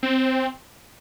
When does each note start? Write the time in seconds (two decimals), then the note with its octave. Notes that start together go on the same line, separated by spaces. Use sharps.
0.03 C4